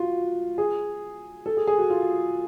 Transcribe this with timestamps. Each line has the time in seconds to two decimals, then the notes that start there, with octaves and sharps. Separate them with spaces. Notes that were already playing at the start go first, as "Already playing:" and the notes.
Already playing: F4 F#4
0.58 G#4
1.46 A4
1.57 G#4
1.67 G#4
1.78 F#4
1.90 F4